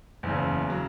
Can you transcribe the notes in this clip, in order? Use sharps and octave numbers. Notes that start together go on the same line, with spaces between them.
F#1 E2 C#3
C#3 F#3